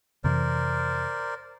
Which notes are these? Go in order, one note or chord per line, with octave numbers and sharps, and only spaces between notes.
F2 C3 E3 A#4 C5 D5